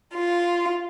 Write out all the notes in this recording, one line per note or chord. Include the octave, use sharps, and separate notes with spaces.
F4